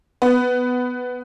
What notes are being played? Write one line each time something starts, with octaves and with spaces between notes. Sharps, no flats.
B3